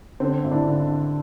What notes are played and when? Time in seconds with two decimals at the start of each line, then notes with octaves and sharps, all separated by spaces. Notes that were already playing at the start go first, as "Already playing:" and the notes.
0.20 D3 C4
0.44 G#1
0.51 D4 E4
0.67 D3